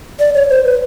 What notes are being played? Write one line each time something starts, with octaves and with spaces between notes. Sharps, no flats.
D5
C#5
C5
B4